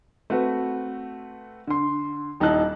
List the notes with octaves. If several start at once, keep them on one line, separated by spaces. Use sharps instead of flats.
A3 C4 F#4 B4
D3 C6
D#1 D#4 E4 A5 F#6 F#7